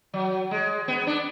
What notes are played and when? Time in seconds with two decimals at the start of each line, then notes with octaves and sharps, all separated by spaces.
0.13 F#3
0.51 G#3
0.88 B3
1.07 D4